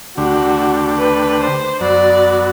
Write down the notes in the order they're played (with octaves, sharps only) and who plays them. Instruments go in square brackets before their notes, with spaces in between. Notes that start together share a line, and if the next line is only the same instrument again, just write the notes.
[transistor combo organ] D2 D3 A3 D4 G4 [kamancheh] F#4
[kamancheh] B4
C5
[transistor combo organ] F#2 F#3 B3 F#4 [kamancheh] D5